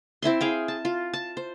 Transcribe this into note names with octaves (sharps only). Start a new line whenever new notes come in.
C4 E4 E5 C6
G#4 F5 G5
A5
F4
A5
C5